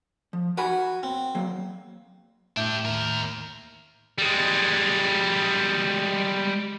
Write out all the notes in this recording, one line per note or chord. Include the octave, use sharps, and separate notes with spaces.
F3
F#4 A#4 G#5 B5
C4
F#3 A#3
A2 D4 G4 E5 G6
D#2 A#4
G3 G#3